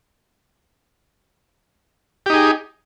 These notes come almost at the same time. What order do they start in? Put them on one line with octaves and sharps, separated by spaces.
G4 D#4 G#4